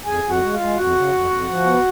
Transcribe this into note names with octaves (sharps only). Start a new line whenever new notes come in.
F2 G#4 G#5
F2
F#4 F#5
G#3
F4 F5
G#3
F2 F#4 F#5
C#3
F2
F2
F3
B3